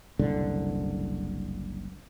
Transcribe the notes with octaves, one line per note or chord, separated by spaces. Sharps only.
F#1 C2 D3